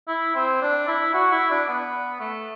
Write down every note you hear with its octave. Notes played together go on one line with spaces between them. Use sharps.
E4
C4
D4
E4
F#4
E4
D4
B3
A3